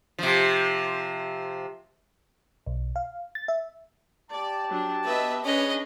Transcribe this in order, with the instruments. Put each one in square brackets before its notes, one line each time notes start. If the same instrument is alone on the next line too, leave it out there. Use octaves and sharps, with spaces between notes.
[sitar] C3 F3
[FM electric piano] B1
F5
A6
E5
[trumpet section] G4 A5 [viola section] D5
[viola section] F#3 D4
[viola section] B3 D#5 E5 [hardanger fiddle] B4
[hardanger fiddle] C#4 D#5 [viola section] D4 G#4 B4